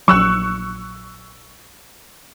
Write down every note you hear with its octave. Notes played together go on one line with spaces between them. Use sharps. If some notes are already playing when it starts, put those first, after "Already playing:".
A#1 F#3 C#6 E6 F#6